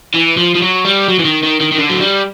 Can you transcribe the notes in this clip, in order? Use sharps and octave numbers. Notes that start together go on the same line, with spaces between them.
E3
F3
F3
F#3
G3
F#3
E3
D#3
D#3
D#3
D#3
D3
F#3
G3